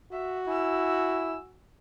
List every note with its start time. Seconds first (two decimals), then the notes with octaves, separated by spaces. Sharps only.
0.12 F#4 E5
0.48 E4 G#5 E6